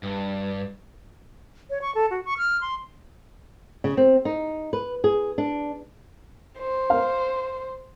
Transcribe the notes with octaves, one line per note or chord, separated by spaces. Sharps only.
G2
C#5
C#6
A4
F#4
C#6
F6
C6
C#3
C4
D#4
B4
G#4
D4
C5
F5